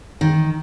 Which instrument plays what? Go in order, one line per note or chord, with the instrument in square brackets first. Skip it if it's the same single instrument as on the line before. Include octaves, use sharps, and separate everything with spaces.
[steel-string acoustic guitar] D#3